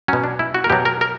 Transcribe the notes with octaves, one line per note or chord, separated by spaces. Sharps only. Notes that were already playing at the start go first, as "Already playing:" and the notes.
B2 F#3 C#4
D4
E4
F#4
A#4
B2 F#3 G4
A#4
A#4